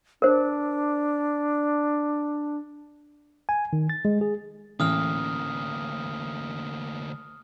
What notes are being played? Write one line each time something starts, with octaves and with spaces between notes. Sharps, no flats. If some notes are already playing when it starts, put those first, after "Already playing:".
D4 A#4 C5
G#5
D#3
A6
G#3
G#4
A1 D2 A#3 D#6 F6